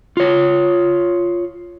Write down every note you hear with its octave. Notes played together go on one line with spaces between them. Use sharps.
F4 C#5